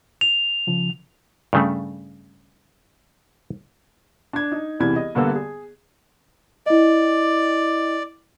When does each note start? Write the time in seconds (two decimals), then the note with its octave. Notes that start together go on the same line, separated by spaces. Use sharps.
0.21 F7
0.67 C#3 F3
1.53 G2 C#3 A3
4.33 D4 G#6
4.52 D#4
4.80 E1 C2 E3 G#6
4.96 D#5
5.15 G2 D3 A#3 B3 F#5 E6
5.36 G#4
6.66 E4 D5 D#5